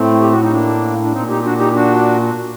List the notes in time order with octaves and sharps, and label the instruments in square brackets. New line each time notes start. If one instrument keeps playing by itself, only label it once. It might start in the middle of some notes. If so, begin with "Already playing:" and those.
Already playing: [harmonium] A2 A3 C4
G4
F#4
D#4
A#3 D4
D4
A#2 C4 D#4
D#4 G4
D4 F#4
D#4 G4
D4 F#4